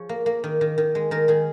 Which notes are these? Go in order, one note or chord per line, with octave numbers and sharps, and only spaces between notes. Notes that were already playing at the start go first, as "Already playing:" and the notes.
Already playing: F3 G#4 C#5
A#3
A#3
D#3
D#3
D#3
G#3
D#3 A#4
D#3 G#4